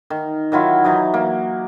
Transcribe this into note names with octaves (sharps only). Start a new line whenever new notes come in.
D#3
D#3 F#3 E4 F4
E3 F#3 D#4
A#3